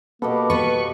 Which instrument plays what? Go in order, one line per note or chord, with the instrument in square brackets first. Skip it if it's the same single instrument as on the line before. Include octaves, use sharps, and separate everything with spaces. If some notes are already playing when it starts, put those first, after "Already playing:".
[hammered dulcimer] B2 G4 A4 [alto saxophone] A#3 [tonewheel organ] B3
[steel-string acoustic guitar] B3 B4 [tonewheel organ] C#6